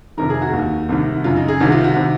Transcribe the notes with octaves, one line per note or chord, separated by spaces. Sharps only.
F2 C3 D#3 A#4
G#4
F#4
D#2 D#3
C2 C3 D#3
F#2 C#3 F4
D#4
G#4
C2 C3 D#3 F#4
F4
F#4
C3 D#3